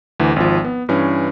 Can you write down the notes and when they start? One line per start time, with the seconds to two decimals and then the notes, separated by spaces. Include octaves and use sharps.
0.20 D2 E3
0.36 G#1 F3
0.64 B3
0.89 G2 E3 C#4